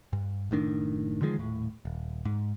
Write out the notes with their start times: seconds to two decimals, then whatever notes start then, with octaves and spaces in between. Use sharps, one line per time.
0.13 G2
0.51 F#1 A2 D#3 D4
1.21 D3 D#3 F3 G#3
1.36 D#1 A2
1.85 D#1
2.25 G#2